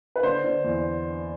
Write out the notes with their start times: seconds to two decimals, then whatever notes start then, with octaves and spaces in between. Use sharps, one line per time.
0.16 B4
0.23 D3 C5
0.44 D3
0.64 E2